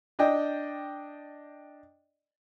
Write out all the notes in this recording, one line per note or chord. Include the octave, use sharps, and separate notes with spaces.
D4 D5 D#5 G5